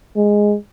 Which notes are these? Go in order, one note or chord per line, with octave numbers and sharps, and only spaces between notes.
G#3